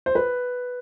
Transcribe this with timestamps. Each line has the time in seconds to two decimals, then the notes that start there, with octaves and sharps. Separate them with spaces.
0.06 C5
0.15 B4